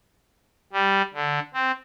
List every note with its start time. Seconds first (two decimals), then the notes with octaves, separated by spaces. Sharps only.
0.73 G3
1.14 D3
1.54 C4